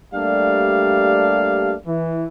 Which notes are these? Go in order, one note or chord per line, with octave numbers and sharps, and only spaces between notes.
G3 A3 A#3 D4 G4 F5
E3